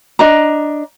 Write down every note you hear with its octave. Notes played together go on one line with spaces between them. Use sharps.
D4 D#5 A#5